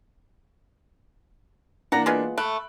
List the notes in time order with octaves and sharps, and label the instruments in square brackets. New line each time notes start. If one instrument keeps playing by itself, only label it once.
[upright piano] E3 A#3 D4 [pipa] F#5 A#5
[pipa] G#3 B3 F4
[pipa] A3 [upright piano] B5 F#6 D7